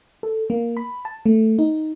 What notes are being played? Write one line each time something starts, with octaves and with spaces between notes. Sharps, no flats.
A4
A#3
B5
A5
A3
D#4